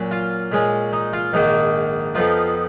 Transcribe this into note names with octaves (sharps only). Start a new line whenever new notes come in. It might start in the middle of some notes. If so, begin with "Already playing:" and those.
Already playing: A#2 F#3 C#4
F4
A#2 G#3 C#4
D#4
F4
A#1 G#2 D#3 A#3 D#4
F2 F3 B3 D#4 F4